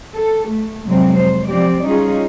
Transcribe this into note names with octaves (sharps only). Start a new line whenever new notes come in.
A4
A3
F2 C3 F#3 G#3 C4
C5
F3 C4 G4 D5
G3 C#4 D#4 F4 G#4